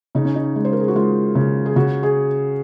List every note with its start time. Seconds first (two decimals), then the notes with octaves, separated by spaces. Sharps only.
0.15 C#3 D#4
0.25 C#4
0.35 D#4
0.56 G#3
0.65 C5
0.73 A#4
0.80 G#4
0.88 F#4
0.95 G#3 F4
1.35 C#3
1.66 G#4
1.76 C#3 F#4
2.03 G#4